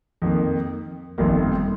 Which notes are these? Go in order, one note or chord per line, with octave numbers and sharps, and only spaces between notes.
F2 D#3 A#3
G1 F2 D#3 A#3